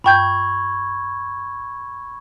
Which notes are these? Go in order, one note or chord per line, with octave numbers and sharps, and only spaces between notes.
G2 G5 B5 C#6 G6 G#6